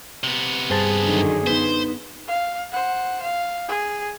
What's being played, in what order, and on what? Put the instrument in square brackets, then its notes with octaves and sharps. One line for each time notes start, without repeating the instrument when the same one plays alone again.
[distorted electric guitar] C3 B3
[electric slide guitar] G2 C5 A5 [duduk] G#4
[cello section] F#2 D3 D#3
[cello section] B3 [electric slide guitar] D#4 B4 [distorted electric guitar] C5
[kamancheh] F5
C5 F#5
F5
G#4